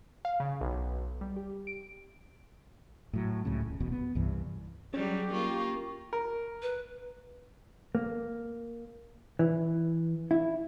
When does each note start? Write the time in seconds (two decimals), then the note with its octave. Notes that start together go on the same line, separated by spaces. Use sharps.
0.25 F5
0.40 C#3
0.61 B1
1.21 G3
1.36 G4
1.67 D7
3.13 A2 F#3
3.45 C#2 A2 C#3
3.60 D#1
3.80 E1 E2 B2
3.92 B3
4.15 C2 G2 E3
4.94 F#3 G3 C#4 G4 G#4
5.33 A#3 F4 C#6
6.13 A#4
6.62 B4
7.95 A#3
9.39 E3
10.31 E4